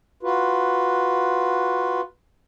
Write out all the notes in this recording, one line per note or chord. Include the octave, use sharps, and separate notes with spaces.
F4 F#4 B4